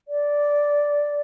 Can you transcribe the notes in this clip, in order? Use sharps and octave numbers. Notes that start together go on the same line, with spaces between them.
D5